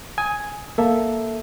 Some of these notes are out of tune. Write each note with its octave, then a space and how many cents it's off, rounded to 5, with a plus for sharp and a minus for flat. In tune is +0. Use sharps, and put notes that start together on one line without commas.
G#5 +0 D#6 +25
A#3 +0 A4 +0 E5 +0